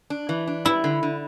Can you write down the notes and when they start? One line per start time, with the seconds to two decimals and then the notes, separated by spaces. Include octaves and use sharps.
0.10 D4
0.29 E3
0.47 D4
0.65 G3 E4
0.84 D3
1.03 D3